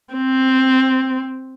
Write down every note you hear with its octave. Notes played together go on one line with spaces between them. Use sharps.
C4